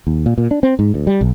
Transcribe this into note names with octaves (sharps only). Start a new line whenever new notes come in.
D#2
A#2
A#2
D4
C4
G#2
D2
G3
B1